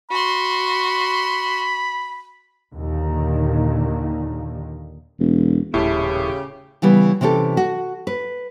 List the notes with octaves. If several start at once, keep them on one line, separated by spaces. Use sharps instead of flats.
F#4 B5 C6
D#2 A#2 D3 D#3
E1
D#1 A2 C#3 E4 G4 A5
C#3 E3 G3 B3
C3 E3 C#4 G4 A4
F#4
B4